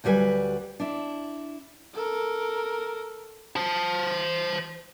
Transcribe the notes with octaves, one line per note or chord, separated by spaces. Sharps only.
D2 F#3 G3 B4 G#5
D4 E4
A4 A#4
C5 A5